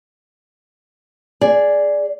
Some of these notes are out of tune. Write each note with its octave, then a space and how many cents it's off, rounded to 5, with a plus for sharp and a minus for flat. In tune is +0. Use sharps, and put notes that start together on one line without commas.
G#4 +0 D5 +0